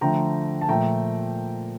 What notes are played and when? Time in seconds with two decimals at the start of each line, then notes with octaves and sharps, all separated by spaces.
0.01 D3 F3 A3 G5 A#5
0.61 A5
0.69 A#2 F3 A3 G5 A#5